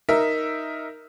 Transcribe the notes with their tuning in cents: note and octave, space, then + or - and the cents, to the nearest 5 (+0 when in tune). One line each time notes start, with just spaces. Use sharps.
D#4 +5 A#4 +0 E5 +0